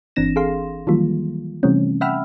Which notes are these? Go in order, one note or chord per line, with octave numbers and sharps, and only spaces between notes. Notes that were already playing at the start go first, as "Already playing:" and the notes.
G1 E3 C4 D4 A#6 E7
G#4 A4 F5 C6
D#3 E3 F#3 G3 A#3 F4
C3 E3 G3 A3 C4 C#4
E5 F#5 G5 B5 E6 F6